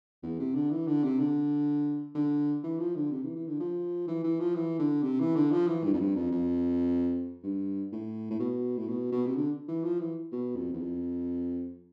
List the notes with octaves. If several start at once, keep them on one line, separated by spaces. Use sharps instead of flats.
E2
C3
D3
E3
D3
C3
D3
D3
E3
F3
D3
C3
E3
E3
D3
F3
E3
E3
F3
E3
D3
C3
E3
D3
F3
E3
G2
F2
G2
F2
F2
G2
A2
A2
B2
A2
B2
B2
C3
D3
E3
F3
E3
B2
F2
E2
F2